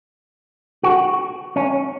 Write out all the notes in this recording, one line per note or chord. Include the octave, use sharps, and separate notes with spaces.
F#4
C#4